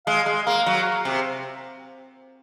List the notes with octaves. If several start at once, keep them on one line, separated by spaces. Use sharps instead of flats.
G#3 F5
G#3
A#3 F5
F#3
C3